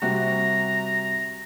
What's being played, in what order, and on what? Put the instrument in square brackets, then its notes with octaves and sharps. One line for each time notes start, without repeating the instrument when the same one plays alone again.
[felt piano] C3 G3 F#4 [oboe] A#5